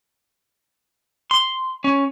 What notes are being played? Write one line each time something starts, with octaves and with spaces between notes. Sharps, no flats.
C6
C#4